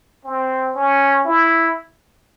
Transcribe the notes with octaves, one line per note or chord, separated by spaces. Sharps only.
C4
C#4
E4